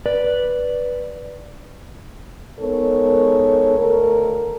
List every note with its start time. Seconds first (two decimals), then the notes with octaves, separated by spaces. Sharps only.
0.06 B4 D5
2.59 G#3 B3 D#4 A4 A#4 C#5
3.78 D2 A4 A#4